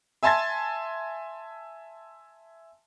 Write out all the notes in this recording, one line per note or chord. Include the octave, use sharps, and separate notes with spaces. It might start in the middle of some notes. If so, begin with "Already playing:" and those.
E5 G#5 A5 C6 G#6 A6